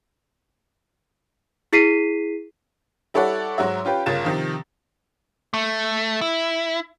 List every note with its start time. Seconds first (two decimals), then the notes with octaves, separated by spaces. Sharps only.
1.73 E4 G#4 B6 C7 D#7
3.14 G3 E4 A4 C#5 D5 F#5
3.58 G#2 F#3 F#4 E5
3.85 C#4 F4 G4 B4 G5
4.06 G1 C#3 F4 A#4 A6 E7
4.24 C3 D#3 F3
5.54 A3
6.21 E4